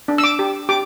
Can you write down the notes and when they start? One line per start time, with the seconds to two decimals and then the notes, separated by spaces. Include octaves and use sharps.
0.08 D4
0.18 E6
0.24 D6
0.39 G4
0.69 G4 D6